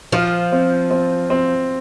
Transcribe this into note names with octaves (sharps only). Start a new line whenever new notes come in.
F3 F4
C4
C4
C4